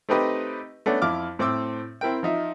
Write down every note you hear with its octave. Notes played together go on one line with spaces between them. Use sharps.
A3 C4 D#4 G4 B4 D#5
A3 B3 C#4 D4
F2 E4 D6 F6
A2 C4 C5 D6 E6
C4 E4 A#4 G5
F3 D#4 E5